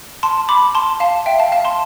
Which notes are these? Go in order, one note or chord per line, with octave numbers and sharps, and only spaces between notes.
A5 C6
B5 D6
A5 C6
F5 A5
E5 G5
F5 A5
F5 A5
A5 C6